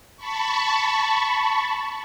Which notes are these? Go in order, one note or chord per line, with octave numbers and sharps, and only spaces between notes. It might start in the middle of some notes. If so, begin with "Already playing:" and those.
A5 B5 C#6